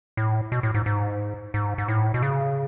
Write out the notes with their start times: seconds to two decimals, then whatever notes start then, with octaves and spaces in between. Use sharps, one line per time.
0.17 A2
0.52 B2
0.63 A2
0.74 G#2
0.86 G#2
1.54 G#2
1.78 G#2
1.88 A2
2.14 B2
2.22 C#3